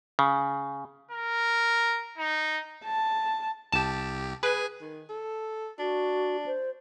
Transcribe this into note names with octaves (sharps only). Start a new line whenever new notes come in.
C#3
A#4
D#4
A5
C2 G4 A5
G#4 B4 G#5
D#3
A4
D4 F#4
C5